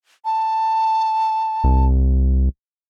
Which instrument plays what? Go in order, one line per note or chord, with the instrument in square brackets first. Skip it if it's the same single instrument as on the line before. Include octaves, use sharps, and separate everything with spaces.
[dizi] A5
[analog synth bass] C2